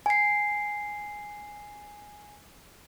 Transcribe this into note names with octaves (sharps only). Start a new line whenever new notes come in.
G#5 C7